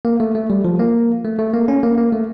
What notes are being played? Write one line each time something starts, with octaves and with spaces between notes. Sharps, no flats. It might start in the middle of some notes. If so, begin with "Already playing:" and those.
A#3
A3
A3
G3
F3
A#3
A3
A3
A#3
C#4
A#3
A#3
A3